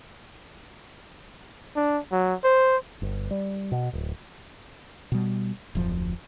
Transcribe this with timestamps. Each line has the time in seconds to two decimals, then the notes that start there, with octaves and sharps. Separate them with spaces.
1.76 D4
2.12 F#3
2.44 C5
3.02 G1
3.31 G3
3.72 B2
3.93 D1
5.12 B2 G3
5.75 D1 F2 F3